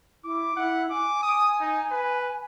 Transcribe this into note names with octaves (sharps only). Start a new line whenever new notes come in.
E4 D6
E4 F#5
G#5 D6
D#6
D#4
B4